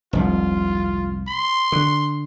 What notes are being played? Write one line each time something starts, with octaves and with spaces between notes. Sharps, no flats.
F1 C2 G#2 F4
C6
D3